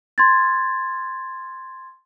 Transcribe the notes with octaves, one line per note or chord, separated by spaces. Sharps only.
C6 G#6 A6